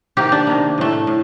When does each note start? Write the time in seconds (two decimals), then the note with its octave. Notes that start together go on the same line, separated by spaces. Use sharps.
0.17 C3 D#3 A#3 G4
0.32 D4
0.47 C3 D#3 A#3
0.78 A2 A3
1.07 A2